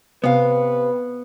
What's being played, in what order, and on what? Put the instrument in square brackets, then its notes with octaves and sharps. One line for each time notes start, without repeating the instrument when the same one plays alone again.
[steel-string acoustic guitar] C3 F5 [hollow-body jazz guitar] B3 [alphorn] B4